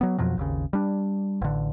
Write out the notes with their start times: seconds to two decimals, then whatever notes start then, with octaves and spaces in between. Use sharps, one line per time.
0.01 F#3 B3
0.18 F2 B2 F3 F#3
0.37 G#1 D#2 C#3
0.73 G3 D4
1.41 A1 D3